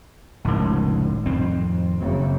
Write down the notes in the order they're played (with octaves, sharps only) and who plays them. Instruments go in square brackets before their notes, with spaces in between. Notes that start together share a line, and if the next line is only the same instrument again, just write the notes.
[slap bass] F1 C#2 [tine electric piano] A2 D#3
[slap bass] F2 C4
[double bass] F#1 C#3